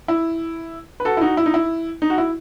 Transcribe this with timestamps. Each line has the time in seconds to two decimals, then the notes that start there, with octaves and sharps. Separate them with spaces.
0.08 E4
1.00 B4
1.05 F#4 A4
1.17 E4
1.21 D#4 F#4
1.37 E4
1.46 D#4
1.54 E4
2.02 D#4
2.10 F#4
2.18 E4